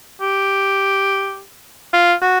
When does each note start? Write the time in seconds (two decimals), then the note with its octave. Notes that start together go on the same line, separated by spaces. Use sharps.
0.21 G4
1.93 F4
2.22 F#4